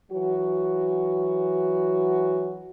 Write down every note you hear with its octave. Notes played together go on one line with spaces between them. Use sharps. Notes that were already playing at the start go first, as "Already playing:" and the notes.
E3 F#3 F#4